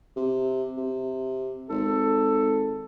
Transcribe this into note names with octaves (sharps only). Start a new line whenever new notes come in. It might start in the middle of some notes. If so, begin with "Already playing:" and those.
C3
C3
G#1 A4